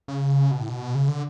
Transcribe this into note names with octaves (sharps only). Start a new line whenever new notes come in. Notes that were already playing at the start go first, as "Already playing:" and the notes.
C#3
B2
A2
B2
C#3
D3